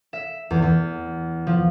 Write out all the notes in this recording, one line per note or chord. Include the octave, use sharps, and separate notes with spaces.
E5
E2
E2
F3